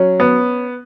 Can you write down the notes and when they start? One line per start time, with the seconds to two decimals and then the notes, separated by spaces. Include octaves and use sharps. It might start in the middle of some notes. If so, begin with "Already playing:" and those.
Already playing: F#3 C#4
0.20 B3